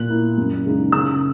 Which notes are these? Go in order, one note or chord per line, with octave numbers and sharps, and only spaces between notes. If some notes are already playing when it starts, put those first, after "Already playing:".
Already playing: A#2 F#6
A#3 E4
F#2
C#3 G#3 D#4
C#3 E6